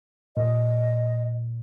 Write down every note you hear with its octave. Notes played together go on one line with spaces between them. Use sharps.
A#2 D#5